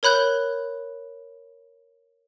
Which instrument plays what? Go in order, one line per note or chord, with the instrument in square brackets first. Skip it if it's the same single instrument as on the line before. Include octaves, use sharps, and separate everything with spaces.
[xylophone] A#4 C#5 B5 F#6 G6